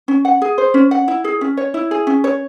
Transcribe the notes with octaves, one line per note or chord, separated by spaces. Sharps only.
C#4
F#5
G#4
C5
C#4
F#5
E4
G#4
C#4
C#5
E4
G#4
C#4
C#5